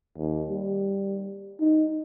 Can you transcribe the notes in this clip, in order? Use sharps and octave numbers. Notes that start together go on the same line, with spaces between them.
D#2
G3
D#4